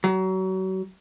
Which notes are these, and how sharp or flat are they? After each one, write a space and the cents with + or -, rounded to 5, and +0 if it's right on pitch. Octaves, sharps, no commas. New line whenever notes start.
F#3 +30